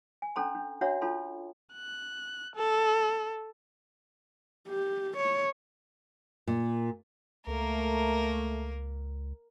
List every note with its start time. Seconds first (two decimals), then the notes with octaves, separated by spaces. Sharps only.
0.22 G#5
0.36 C#4 D4 A4 A#5 C6
0.55 D4
0.81 D4 F#4 C#5 E5 F#5 A#5
1.01 D4 F4 A4 A5 C6
1.73 F#6
2.56 A4
4.69 G4
5.17 C#5
6.47 A#2
7.47 C#2 A3 A#3 A#4